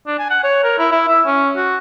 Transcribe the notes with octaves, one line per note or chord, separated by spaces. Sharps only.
D4
G#5
F#5
C#5
A#4
E4
E4
E5
C#4
F#4